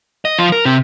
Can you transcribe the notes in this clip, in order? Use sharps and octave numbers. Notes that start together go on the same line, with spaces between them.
D#5
F3 F4
A#4
C3 C4